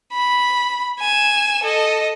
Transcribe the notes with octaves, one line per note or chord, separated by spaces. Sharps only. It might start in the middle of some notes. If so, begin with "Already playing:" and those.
B5
G#5 E7
A4 D#5